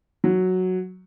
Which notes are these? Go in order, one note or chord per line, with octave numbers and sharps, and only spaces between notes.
F#3